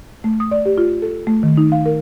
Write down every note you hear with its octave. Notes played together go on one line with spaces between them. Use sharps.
A3
D#6
D5
G4
F4
A4
A3
D#3
D#4
F5
A#4